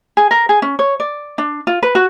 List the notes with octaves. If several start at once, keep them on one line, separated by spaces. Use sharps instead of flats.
G#4
A#4
G#4
C#4
C#5
D5
D4
F4
B4
F#4